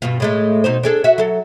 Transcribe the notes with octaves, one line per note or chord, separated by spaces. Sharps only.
G2 B2 F4
A2 G#3 A3
B2 D#4 C5
D4 G#4 A4
F#4 E5
F#3 A4